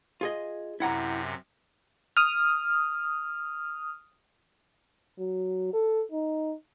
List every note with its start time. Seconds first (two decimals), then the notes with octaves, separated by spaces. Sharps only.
0.21 F4 G#4 D#5
0.80 F#2 C3 E4 F#5 A#5
2.17 D#6 F6
5.19 F#3
5.73 A4
6.12 D#4